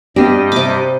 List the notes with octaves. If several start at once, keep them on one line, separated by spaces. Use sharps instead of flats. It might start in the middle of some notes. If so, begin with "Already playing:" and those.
G2 G3 B3 C4 D4 G4 D#5
C3 D6